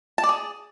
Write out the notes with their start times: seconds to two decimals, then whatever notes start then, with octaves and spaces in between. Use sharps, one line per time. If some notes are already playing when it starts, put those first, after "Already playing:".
0.18 A5
0.23 D5
0.29 G#4